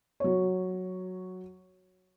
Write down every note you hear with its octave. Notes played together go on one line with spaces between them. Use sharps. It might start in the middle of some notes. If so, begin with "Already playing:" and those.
F#3 C#5